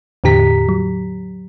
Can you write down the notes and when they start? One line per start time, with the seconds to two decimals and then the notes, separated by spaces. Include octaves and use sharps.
0.24 E2 A2 D3 G4 A#5 B6
0.69 F#3